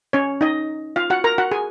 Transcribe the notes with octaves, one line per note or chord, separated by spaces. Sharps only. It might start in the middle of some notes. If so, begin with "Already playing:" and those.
C#4 C#5
D#4 D#5
F4 F5
F#4 F#5
A#4 A#5
F#4 F#5
G#4 G#5